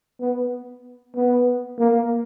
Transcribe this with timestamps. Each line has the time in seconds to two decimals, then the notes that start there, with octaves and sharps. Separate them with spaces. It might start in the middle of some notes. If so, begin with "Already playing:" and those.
0.21 B3
1.15 B3
1.79 A#3